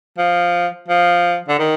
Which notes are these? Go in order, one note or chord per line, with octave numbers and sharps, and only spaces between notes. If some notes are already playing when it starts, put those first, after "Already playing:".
F3
F3
D3
D#3